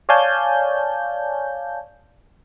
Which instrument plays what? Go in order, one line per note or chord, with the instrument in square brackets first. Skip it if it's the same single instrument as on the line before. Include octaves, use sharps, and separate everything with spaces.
[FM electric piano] C#5 D5 F5 G#5 A5 G6